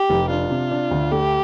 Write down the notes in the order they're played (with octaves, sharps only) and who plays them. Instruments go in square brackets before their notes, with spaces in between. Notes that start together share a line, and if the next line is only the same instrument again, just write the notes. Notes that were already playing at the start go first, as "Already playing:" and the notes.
Already playing: [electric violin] G4
[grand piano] F1
[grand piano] D4 [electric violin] F4
[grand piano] C3
D4
D2
[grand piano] A3 [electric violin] G4